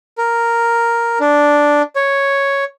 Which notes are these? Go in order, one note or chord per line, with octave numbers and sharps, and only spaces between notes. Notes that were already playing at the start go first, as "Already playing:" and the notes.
A#4
D4
C#5